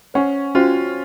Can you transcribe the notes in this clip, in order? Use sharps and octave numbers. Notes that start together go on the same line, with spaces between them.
C#4 C5 F#5 C#6
C#4 F4 F#4 C5